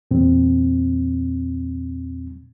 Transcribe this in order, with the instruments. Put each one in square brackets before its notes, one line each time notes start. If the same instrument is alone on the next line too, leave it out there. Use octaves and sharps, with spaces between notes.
[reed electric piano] E2 A#2 C4